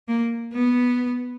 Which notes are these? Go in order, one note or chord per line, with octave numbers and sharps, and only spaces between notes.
A#3
B3